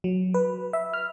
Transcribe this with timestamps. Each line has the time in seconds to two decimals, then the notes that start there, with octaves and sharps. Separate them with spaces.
0.04 F#3
0.34 B4
0.73 E5
0.93 F6